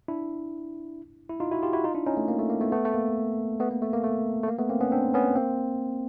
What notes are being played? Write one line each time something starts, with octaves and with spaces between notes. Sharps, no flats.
D4 E4
E4
D#4 F4
E4 F#4
F4 G4
E4 F#4
D#4 F4
D4 E4
C#4 D#4
A3
A#3
A3
A#3
A3 B3
A3 B3
A3
A#3
A3 B3
A#3
A3
A#3
A3
A3
A#3
A3 B3
A#3 C4
B3 C#4
C4 D4
B3 C#4
A#3 C4